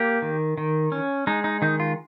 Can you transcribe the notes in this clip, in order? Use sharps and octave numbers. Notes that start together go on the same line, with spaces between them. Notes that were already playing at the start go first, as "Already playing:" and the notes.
Already playing: A#3 G4
D#3
D#3
C#4
G#3 D#4
D#4
D#3 D#4
F4